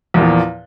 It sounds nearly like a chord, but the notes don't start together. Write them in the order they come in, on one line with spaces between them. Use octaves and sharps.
E2 A#2 F3